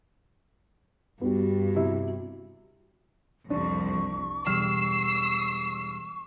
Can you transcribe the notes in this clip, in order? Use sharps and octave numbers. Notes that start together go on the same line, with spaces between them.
G2 G3 B3 F#4
C3 E4
C2 F2 D4 C#6
E1 G3 E6 F6 C7